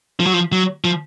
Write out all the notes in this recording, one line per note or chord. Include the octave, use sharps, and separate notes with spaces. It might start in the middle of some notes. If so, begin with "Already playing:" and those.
F3
F#3
F3
F#3
F3